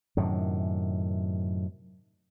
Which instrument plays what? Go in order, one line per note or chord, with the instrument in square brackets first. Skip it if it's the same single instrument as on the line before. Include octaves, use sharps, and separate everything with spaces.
[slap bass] F#2 A2 C3 D#3